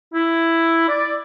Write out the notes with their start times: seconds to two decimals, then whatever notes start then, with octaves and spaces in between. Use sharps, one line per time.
0.14 E4
0.89 D5